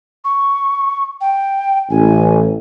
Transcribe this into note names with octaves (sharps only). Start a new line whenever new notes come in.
C#6
G5
A1 G#5